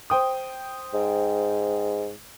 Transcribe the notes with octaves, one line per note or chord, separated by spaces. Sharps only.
C5 G5 D#6
G#2